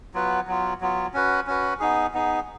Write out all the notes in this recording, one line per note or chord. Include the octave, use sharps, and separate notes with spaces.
F#3 B3 F4 B4
F#3 B3 F4
F#3 B3 F4
C#4 F#4 B4
C#4 F#4 B4
B3 D#4 G#4
B3 D#4 G#4